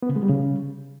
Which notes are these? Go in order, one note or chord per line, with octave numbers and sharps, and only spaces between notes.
B3
C#3
G#3
G3
C#3